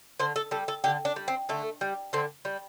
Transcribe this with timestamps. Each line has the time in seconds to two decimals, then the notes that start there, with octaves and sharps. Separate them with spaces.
0.19 D3 C5
0.36 A4
0.51 G3 A4
0.68 A4
0.84 D3 G4
1.05 D4
1.16 G3
1.28 C4
1.49 D3 A3
1.81 G3
2.13 D3 C4
2.45 G3